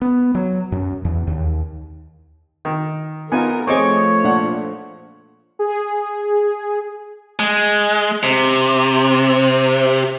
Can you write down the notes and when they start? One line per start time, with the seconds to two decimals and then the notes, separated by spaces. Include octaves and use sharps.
0.01 B3
0.35 F#3
0.72 F#2
1.05 E2
1.27 D#2
2.65 D#3
3.32 B3 D#4 F4 A#4 G#5
3.67 F3 A3 C4 G#4 C#5 D#5 C#6 D6
4.24 A#2 D4 F#5
5.59 G#4
7.39 G#3
8.23 C3